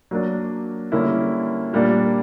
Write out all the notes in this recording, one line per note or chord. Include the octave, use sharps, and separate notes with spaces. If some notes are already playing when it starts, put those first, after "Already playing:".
F#3 A#3 D4
D3 G3 A#3 C#4 E4
A#2 G3 A#3 D4